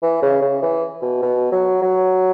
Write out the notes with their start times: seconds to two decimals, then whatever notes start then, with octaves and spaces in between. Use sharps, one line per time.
0.03 E3
0.22 C#3
0.42 C#3
0.62 E3
1.02 B2
1.22 B2
1.52 F#3
1.82 F#3